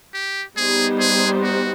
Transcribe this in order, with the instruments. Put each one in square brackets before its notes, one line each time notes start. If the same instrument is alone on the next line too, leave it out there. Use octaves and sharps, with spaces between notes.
[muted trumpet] G4
[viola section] G3 B3 D#4 G4 C5 [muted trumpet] G#4
[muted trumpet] G#4
F#4